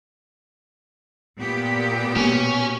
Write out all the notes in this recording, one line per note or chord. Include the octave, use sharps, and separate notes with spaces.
A#2 B3 G4
B2 A#3 C#4